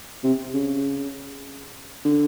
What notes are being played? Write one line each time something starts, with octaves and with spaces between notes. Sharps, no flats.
C3
C#3
D3